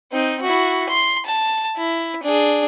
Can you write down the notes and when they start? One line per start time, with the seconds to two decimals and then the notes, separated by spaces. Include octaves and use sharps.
0.12 C4 D#4
0.42 E4 F#4
0.89 C6
1.26 A5
1.77 E4
2.23 D4 G#4